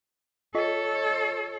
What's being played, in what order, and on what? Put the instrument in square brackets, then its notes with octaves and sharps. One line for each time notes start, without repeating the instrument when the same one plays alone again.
[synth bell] F4 D#5 [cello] A4 C#5